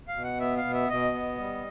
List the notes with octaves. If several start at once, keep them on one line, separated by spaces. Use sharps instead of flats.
F5
B2
F#5
B3 E5
F5
B2
E5
B2 D#5
B3
G3